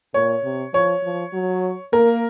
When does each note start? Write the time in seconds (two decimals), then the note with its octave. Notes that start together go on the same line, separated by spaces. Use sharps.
0.14 A#2 C#5
0.44 C3
0.74 F3 C#5
1.03 F3
1.33 F#3
1.93 A#3 A#4